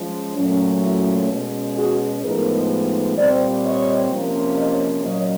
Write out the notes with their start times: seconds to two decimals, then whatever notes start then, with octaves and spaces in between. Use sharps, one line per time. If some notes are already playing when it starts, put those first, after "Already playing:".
Already playing: F3 G#3 C#4
0.36 A#2 F#3 A3 C#4
0.82 E4 F#4
1.30 B2 G#3 C#4
1.77 F#4 G#4
2.23 A2 F3 G#3 B3 D#4 G#4 A#4
3.17 A#2 G3 C4 C5 D5
3.64 C#5 D#5
4.11 C3 F3 A#3 C#4
4.57 C#5 D#5
5.04 A#2 F#3 A#3 C#4 C#5 D#5